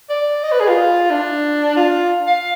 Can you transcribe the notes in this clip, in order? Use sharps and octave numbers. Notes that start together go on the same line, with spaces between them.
D5
D#5
B4
G#4
F4
D4
F4
F5